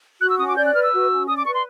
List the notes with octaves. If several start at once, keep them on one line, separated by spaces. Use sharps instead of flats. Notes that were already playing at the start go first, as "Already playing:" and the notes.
F#4 F#6
E6
C#4 D#6
D6
D5 G6
F#6
B4 F6
E6
F#4
C#4
D5 D#6
D6
B4 C#6
C6